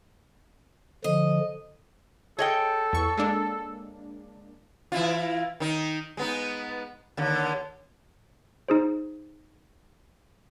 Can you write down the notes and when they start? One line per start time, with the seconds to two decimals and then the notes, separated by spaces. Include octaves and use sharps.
1.04 D3 F3 D#5
2.39 G#4 A4 C#5 D#5 G5
2.93 E2 C#6
3.17 G#3 A#3 D4
4.92 E3 E4 F4
5.60 D#3 D#4
6.17 G#3 B3 D#4
7.17 D#2 D3
8.68 D#4 G#4 C5